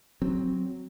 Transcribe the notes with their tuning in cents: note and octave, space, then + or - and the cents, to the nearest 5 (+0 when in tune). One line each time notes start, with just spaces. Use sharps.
F#3 +0 C4 +0